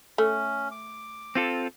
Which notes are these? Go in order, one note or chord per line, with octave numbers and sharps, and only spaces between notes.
A3 C#4
D6
C4 F4 A4